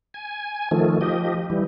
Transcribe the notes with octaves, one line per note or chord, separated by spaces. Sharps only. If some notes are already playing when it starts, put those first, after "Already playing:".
G#5
D#3 F3 A3
F3 G4 D#5
E3 G3